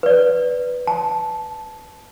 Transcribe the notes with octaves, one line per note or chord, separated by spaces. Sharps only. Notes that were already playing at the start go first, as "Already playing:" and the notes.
B4 D5
A5